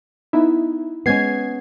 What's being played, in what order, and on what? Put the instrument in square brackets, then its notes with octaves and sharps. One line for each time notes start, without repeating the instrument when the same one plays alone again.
[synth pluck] B3 D#4 E4
[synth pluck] G#3 G#6 C7 [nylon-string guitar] B3 C#4